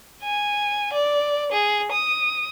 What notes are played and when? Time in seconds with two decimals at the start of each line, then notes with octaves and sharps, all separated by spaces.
0.24 G#5
0.93 D5
1.52 G#4
1.92 D#6